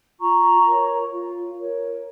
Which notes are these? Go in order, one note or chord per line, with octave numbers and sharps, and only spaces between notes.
F4 A#5 C#6
A#4 C#5
F4
A#4 C#5